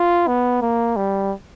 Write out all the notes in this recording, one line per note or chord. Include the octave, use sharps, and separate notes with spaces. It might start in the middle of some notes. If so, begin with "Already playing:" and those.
Already playing: F4
B3
A#3
G3